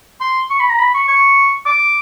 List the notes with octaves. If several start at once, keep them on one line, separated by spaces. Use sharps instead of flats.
C6
C#6
B5
A#5
B5
C#6
C#6
D6